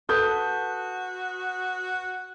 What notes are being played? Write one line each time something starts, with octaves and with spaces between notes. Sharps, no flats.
F#4 A4 B4 D#6 G6